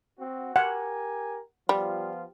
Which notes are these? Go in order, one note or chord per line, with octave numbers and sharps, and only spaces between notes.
C4 F#4
G4 A#4 F#5 G#5
F3 G3 B3 F4